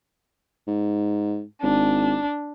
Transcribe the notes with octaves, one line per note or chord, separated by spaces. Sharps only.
G#2
G#1 D4